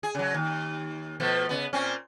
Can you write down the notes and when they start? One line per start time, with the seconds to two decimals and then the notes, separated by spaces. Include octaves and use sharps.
0.03 G#4
0.15 C#3 F#3
0.34 D#2
1.20 B2 F3 A3
1.49 C#3 B3
1.73 A#2 C4 C#4